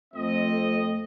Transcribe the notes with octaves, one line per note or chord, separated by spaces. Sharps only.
F2 A3 C4 D#5